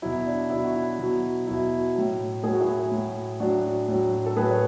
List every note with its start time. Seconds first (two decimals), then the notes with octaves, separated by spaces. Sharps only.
0.02 B2 F#3 E4
0.26 D4
0.50 B2 F#3 E4
0.64 F#4
0.75 E4
0.99 B2 F#3
1.47 B2 F#3 E4
1.95 A2 F#3
2.44 A2 F#3 G#4
2.53 F#4
2.61 E4 G#4
2.92 A2 F#3
3.40 A2 F#3 D4 F#4
3.88 A2 F#3
4.26 A4
4.37 A2 F#3 G#4 B4
4.51 C#5